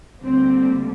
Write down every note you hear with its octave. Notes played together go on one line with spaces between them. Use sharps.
D2 D3 G3 A#3 C4